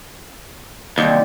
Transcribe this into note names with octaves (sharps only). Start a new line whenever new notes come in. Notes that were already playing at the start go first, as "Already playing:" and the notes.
D#2 C3 F#3 G3